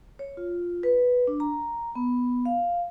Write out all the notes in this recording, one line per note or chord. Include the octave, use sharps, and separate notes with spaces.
C#5
F4
B4
D4
A#5
B3
F5